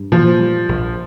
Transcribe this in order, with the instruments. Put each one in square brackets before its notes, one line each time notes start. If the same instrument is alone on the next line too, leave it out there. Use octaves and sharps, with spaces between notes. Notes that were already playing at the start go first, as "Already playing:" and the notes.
Already playing: [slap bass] G2
[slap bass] A#2 [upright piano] F3
[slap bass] G3
A#1